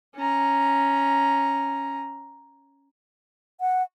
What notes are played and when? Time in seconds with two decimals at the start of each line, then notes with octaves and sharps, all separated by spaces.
0.16 C#4 A#5
3.61 F#5